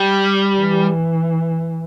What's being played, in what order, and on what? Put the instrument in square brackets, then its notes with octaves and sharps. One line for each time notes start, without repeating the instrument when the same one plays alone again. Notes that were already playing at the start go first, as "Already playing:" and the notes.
Already playing: [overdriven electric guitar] G3
[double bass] E3